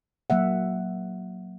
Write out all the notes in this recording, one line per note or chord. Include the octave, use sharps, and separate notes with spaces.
F#3 A#3 E5 F#5